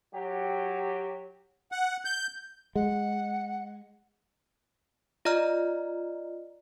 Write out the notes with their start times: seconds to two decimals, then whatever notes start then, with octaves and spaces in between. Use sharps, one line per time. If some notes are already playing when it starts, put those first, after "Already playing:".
0.13 F#3 G4
1.72 F#5
2.05 G6
2.76 G#3 F#5
5.25 F4 D5 D#5 A#5 F6